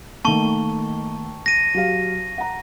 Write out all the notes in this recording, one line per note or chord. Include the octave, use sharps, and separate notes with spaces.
D#3 A3 A#3 A5 C#6
A#6 D#7
F#3 G4 F5
F#5 A#5